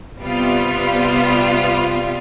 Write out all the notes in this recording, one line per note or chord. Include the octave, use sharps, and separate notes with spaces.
C3 G3 B3 F4